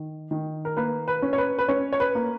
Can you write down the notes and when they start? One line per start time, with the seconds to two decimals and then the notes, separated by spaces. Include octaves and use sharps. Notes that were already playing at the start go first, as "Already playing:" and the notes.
Already playing: D#3
0.31 D#3
0.65 A#4
0.77 A#3 B4
1.08 B4
1.22 C#4
1.33 C#5
1.38 B4
1.59 B4
1.68 C#4 C#5
1.93 C#5
2.00 B4
2.15 A#3